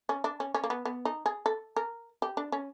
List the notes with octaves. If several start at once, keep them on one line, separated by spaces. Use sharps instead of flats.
C#4
D4
C#4
C#4
A#3
B3
B3
D#4
G#4
A4
A#4
G4
D4
C#4